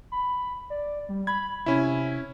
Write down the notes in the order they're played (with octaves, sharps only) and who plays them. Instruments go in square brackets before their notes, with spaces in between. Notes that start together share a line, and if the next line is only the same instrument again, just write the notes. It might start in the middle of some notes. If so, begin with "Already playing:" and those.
[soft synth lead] B5
D5
G3
[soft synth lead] B5 [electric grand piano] G#6
[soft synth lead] C3 [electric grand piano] C#4 E4